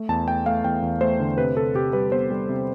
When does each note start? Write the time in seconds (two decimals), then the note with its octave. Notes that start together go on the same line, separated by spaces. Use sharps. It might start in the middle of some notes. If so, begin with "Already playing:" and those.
Already playing: A3
0.09 E2 A5
0.28 A3 G5
0.46 A3 F5
0.64 E2 G5
0.82 E2
1.01 A3 C5
1.20 D3
1.38 C3 B4
1.57 C3 A4
1.74 C3 G4
1.93 G3 B4
2.12 B3 C5
2.30 G3
2.49 C3